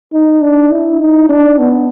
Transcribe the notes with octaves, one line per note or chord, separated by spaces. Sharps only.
D#4
D4
E4
D#4
D4
B3